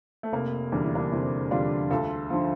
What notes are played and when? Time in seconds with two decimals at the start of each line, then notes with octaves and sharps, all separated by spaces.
0.23 A3
0.32 F1 A#3
0.72 E2 D3 G3 D4
0.84 E4
0.95 A#3 D4
1.12 F1 C4 E4
1.51 E2 D3 G3 D4 F4
1.90 D2 F4 A4
2.30 D3 F3